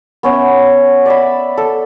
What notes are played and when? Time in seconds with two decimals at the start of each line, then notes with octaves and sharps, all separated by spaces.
0.23 B3 C#4 E5 F#5
1.06 D5 E5 B5
1.57 A4